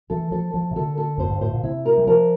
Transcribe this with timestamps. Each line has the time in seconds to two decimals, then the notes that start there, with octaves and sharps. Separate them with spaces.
0.10 E3 A4
0.31 F3 A4
0.54 F3 A4
0.71 C3
0.76 D3 A4
0.98 A4
1.18 F2 C5
1.30 G2
1.41 A2 C5
1.53 A#2
1.63 C3 E4
1.86 A#4
1.98 G3
2.07 F3 A#4